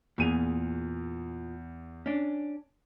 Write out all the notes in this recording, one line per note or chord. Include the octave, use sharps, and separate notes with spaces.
E2 A#2 G#4 D#7 F7
C#4 D4